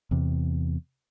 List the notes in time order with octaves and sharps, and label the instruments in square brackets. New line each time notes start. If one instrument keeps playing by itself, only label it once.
[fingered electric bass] E2 C3